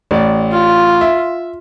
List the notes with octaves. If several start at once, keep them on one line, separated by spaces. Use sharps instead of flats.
A1 D5
F4
E5